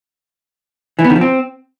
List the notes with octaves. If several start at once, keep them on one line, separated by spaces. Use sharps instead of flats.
E3
B3
D#3
F3
C4